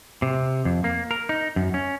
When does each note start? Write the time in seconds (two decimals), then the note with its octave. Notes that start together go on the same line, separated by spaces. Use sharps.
0.22 C3
0.65 F2
0.84 A#3
1.11 A#4
1.29 D#4
1.56 F#2
1.74 C#4